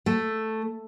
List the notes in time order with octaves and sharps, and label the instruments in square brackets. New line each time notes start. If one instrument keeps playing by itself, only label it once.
[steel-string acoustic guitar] A3